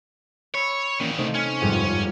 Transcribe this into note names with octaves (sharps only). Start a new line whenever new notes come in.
C#5 B5 E6
A#2 D#3 E3 A#3 C#4
C3 A3 D#4 C5
C#4 G#5 F6
G1 F2 G#2